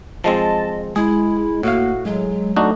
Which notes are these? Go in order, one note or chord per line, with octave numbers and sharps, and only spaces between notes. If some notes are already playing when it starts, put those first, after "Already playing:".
F3 G#3 C4 D#5 A5
G#3 E4 G#4
A2 A#3 F#4 F5
F#3 G#3
A3 D4 D#4 F#4